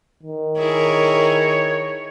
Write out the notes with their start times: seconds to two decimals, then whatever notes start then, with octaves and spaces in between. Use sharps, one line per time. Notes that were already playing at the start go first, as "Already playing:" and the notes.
0.23 D#3
0.57 E4 G#4 A#4 C#5